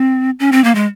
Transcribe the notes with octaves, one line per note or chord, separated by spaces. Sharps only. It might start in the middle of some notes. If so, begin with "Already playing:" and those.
Already playing: C4
C#4
C4
A#3
G#3